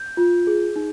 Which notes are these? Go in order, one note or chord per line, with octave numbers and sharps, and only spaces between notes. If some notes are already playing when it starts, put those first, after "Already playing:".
Already playing: G6
F4
G#4
D#4